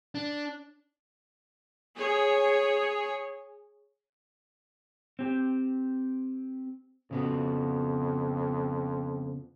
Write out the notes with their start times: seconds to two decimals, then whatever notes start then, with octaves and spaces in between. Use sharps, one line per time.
0.15 D4
1.97 G#4 C#5
5.19 C4 G4
7.11 F2 C#3 B3 F#4